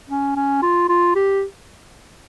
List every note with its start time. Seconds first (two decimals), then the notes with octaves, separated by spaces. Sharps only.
0.10 C#4
0.36 C#4
0.62 F4
0.89 F4
1.15 G4